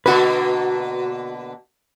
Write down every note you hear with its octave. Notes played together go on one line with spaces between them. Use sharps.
B2 D3 A#3 F#4 B4